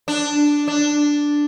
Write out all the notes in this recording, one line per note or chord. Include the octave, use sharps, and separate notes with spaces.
D4
D4